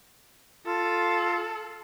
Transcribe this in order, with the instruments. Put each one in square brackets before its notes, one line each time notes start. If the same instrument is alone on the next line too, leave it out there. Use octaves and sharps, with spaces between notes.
[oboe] F4 [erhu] A4